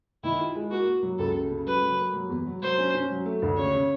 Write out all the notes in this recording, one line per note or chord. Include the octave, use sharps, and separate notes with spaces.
D#3 E4
F4
G#3
A#3 F#4
A#3
F#3
C#2 A4
C#3
C#3
F#3 B4
F#3
A#3
F#3
E2
F#3
F#3 C5
C#4
C#4
F#3
A3
D2
C#3 C#5
C#3